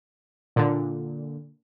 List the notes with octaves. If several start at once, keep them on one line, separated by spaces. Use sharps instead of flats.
A#2 D3